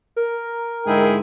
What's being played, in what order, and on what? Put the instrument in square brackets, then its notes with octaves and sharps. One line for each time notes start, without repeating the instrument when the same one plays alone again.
[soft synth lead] A#4
[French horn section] G#2 D3 G#3 [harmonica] E4 G#4 G5